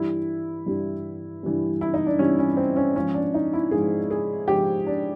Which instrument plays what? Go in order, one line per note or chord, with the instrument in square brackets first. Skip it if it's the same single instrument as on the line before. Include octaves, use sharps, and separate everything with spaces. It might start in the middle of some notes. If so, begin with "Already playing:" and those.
Already playing: [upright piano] G2 E3 G3 E4
G2 E3 G3
G2 E3 G3
E4
D#4
D4
G2 E3 G3 C#4
C#4
C4
C#4
G#2 F3 C#4
D4
D#4
E4
G#2 F3 G#4
G#4
G#2 F3 G4
D4